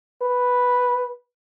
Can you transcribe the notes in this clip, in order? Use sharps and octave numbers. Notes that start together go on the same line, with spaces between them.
B4